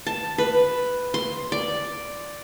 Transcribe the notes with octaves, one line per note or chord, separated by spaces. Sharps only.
A5
B4
C6
D5